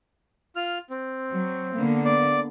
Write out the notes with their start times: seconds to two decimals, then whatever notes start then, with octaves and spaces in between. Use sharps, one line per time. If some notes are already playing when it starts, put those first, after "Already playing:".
0.56 F4 F6
0.90 C4
1.32 F#3
1.74 D3 A#3 B3
2.05 D5